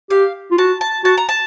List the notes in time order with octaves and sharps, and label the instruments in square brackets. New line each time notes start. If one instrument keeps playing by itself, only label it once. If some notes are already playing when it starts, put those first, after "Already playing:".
[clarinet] G4 [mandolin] F5
[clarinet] F4
[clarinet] F#4 [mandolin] A5
[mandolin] A5
[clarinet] F#4 [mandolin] A5
[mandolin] A#5
A5